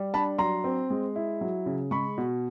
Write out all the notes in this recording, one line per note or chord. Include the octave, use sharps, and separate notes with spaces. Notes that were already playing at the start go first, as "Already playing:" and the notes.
Already playing: G3
D4 A5 B5
F#3 A#5 C6
C4
G#3
E4
F#3
C#3
G#3 B5 C#6
B2